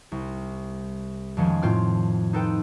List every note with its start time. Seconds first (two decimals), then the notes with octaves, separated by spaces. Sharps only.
0.12 C2
1.37 F2 D#3 F3 G#3 C#4
1.62 A2 C4 F4 G5 F6
2.33 D#4 F4 A4 B4 G5